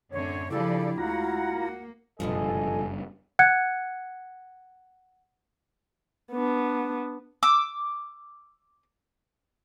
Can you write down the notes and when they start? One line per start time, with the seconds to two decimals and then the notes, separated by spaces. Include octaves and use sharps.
0.12 F#2 A2 D3 C4 C#5
0.51 C#3 F3 D4 E4 G4 A4 D5
0.98 D2 G#3 F4 F#4 F5 F#5 A#5
1.51 A#3
2.20 F#1 G2 B2 D3 F3 A4 D#5 G#5
3.39 F#5 F#6 G#6 C#7
6.32 B3 D4
7.43 D6 E6